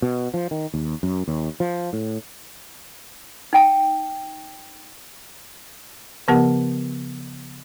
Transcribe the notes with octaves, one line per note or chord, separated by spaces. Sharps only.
B2
F3
D#3
D#2
F#2
D#2
F3
A2
D#4 G5 A5
C#3 F3 B3 G4 A#4 F#5